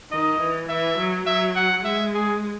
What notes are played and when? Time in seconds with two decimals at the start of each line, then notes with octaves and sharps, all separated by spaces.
0.11 D#3 D#5
0.40 E3
0.69 E3 E5
0.98 F#3
1.26 F#3 E5
1.56 F#5
1.85 G#3 E5
2.14 G#4